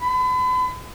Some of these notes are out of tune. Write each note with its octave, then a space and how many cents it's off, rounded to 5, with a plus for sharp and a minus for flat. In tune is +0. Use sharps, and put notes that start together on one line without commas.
B5 +40